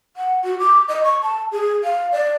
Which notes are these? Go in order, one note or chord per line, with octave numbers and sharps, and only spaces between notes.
F#5
F#4
D6
D#5
C#6
A5
G#4
F5
D5